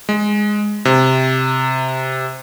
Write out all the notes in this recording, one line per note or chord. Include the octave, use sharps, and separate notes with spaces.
G#3
C3